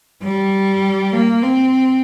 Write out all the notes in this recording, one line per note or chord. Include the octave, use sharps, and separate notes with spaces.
G3
A#3
C4